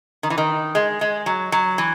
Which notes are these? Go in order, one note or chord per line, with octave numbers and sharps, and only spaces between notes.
D#3
E3
D#3
G#3
G#3
F#3
F#3
E3